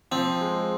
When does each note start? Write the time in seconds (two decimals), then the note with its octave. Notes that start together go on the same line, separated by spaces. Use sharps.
0.11 F3 C4
0.41 G#3